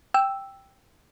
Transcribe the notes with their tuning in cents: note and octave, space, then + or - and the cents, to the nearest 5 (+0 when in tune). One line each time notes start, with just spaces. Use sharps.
G5 +0 E6 +0